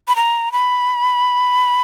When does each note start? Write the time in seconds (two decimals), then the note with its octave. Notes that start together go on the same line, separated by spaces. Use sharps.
0.08 B5
0.16 A#5
0.52 B5